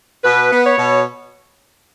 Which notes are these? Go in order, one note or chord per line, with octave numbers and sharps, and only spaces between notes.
B2 B4
B3
C#5
B2